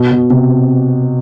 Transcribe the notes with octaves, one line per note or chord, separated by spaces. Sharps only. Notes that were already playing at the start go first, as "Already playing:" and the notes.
Already playing: B2
B2
C3